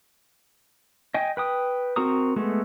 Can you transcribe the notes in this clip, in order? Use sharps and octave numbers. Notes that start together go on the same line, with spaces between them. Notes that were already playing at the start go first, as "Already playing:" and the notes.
D#5 G5 G#5
B4 G5 D#6
C4 F#4 A#4 A#5 D#6
G#3 A3 B3